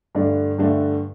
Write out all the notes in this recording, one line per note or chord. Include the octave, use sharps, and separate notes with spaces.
G2 D3 A3 D4
G2 D3 A3 D4